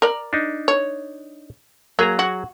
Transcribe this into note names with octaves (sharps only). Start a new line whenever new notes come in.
A#4 D5
D4 D#4
C#5
F#3 A#3 G#4 A#5
F#4